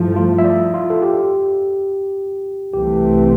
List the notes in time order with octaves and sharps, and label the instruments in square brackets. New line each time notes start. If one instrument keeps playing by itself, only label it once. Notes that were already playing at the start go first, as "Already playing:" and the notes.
Already playing: [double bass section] G2 F3 A3 [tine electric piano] E4
[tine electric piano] F4
E5
D5
F4
A4
G4
[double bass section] C2 C3 E3 A3 C4 [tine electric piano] G4